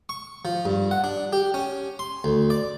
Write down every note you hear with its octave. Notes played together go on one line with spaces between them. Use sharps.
C#6
F3
G2
F#5
D4
G4
C#4
C6
D2
D5